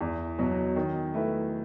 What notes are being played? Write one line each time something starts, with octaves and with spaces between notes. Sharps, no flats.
E2
B2 F#3
D#3
A3 E4 B4